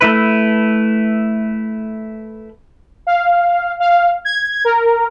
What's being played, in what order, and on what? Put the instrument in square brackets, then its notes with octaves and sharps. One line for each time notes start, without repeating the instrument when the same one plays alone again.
[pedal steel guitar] A3 E4 B4
[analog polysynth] F5
F5
G#6
A#4